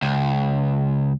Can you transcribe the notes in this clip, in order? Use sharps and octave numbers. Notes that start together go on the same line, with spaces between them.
C#2